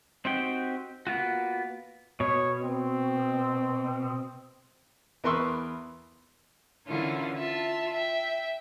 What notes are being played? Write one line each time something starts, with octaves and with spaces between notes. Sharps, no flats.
C4 D#4 F#4 G4 G5
A#3 B3 F4 F#4
B2 C#5
C4
E2 A#4 B4 C6 C#6 E6
D3 E3 C#4 E4 F4 A#4
F4 E5 A5
E5 G5